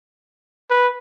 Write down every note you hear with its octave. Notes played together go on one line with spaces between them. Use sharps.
B4